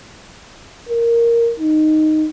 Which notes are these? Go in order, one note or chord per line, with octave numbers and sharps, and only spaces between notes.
A#4
D#4